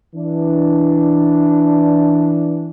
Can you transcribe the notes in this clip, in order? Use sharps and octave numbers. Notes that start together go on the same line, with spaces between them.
E3 D4